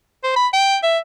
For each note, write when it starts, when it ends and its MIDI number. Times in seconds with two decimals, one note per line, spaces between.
0.24 0.32 72
0.36 0.48 83
0.53 0.77 79
0.83 0.98 76